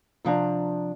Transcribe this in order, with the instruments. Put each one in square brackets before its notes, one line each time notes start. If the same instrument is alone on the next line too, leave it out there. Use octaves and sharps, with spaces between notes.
[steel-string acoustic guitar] C3 F3 D4 A#5